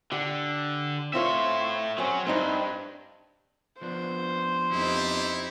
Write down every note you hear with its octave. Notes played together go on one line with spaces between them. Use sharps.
D3 G4
A2 C4 F4 C#5 E5
F#3 C4 C#4 G#4
G2 C4 D#4 E4
F3 B3 D4 C5
F2 D#4 E4 G4